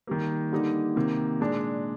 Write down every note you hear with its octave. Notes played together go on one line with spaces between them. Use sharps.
D#3 G3 A#3
D3 G3 A#3 D#4
C3 D#3 A#3
A#2 G#3 D4